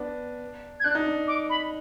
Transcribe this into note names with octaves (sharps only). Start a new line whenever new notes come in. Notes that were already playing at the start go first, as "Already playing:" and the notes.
Already playing: B3 D4
G#6
D4 F#6
D#4
D4
D6
B5